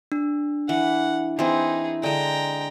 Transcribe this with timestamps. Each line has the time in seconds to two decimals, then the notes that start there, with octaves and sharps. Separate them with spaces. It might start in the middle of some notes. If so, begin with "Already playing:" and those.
0.12 D4
0.69 E3 F#5
1.39 E3 C4 D#4 G#4
2.03 D3 G#3 G5 A#5